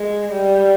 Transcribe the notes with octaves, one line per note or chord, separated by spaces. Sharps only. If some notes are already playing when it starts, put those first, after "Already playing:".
Already playing: G#3
G3